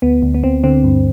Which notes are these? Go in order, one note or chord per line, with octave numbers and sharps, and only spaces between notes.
D2 B3
D2
B3
D2 C4
D3 C4
G2